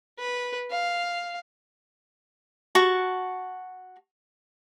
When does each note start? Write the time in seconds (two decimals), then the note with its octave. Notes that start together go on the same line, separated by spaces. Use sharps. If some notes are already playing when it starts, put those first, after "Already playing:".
0.19 B4
0.71 F5
2.75 F#4 A5 C#6